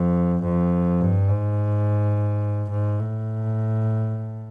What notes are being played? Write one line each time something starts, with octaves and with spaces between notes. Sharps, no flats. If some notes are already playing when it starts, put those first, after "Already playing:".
Already playing: F2
F2
G2
G#2
G#2
A2